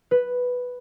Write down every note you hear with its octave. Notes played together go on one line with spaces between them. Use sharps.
B4